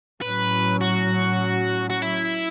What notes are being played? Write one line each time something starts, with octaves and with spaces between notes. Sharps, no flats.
A2 F#3 C#4 B4
F#4
F#4
E4